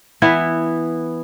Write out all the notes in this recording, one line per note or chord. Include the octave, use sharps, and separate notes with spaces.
E3 B3 E4